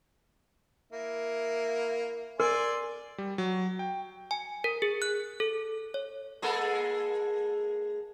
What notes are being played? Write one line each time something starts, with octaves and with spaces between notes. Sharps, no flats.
A#3 E4
A#4 D5 G#5 C6
G3
F#3
G5
G#5
A#4
G#4
F#6
A4
C#5
G#3 A#3 A4